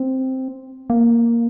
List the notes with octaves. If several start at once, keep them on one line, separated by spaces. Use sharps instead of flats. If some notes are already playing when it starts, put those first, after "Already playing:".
Already playing: C4
A#3